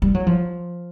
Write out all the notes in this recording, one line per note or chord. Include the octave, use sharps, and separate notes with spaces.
G3
F#3
F3